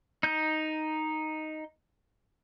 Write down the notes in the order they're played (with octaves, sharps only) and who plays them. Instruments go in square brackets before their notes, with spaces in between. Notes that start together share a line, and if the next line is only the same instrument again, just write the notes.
[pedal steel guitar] D#4 G6